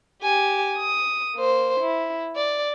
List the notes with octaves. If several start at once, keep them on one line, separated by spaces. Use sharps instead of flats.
G4 G#5
D#6
A#3 C5
E4
D5